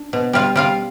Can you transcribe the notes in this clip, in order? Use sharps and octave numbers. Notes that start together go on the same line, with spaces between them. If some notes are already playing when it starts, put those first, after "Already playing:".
Already playing: D4
B2
G3 F4 F5
G3 F4 F5